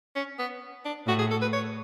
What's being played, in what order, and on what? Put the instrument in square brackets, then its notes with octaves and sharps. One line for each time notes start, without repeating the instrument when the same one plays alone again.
[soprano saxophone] C#4
B3
D4
[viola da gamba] A2 [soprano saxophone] F#4
[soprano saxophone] G#4
A4
B4
C#5